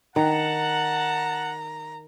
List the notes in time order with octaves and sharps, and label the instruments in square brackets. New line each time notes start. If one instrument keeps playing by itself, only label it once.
[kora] D#3 [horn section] F#5 A5 [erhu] A#5